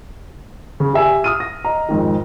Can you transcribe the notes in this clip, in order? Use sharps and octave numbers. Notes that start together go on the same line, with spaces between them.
C#3
G4 E5 G#5
D#6 F6 D#7
A#6
D#5 A#5
F2 G#2 D#3